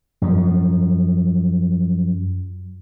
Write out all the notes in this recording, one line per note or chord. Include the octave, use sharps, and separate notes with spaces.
F#2 F3